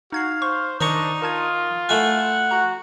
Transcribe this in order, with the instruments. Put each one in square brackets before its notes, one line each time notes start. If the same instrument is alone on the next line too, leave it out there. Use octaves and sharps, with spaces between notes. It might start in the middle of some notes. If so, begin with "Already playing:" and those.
[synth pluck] D#4 G#6 C7 [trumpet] F#4 [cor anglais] F5
[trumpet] C5 [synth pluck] C#6
[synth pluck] D#3 [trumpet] D4 [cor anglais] D#4 [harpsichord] C5 A#5 C#6
[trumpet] F4 [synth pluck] A#4 A5 G#6
[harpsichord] A3 E4 G#5 [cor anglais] F#5
[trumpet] F#4 [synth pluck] A#5